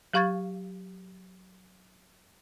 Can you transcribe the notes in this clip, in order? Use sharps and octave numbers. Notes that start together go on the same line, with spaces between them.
F#3 G4 F5 C#6 G#6 A6